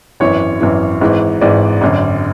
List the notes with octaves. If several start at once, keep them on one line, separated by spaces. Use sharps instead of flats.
G#1 F#2 E3 C#5
G#1 F#2 E3
G#1 G#2 E3
G#1 G#2 E3 D5
G#1 F#2 D3